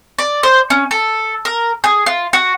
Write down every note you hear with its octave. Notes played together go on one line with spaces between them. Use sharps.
D5
C5
C#4
A4
A#4
G#4
F4
F#4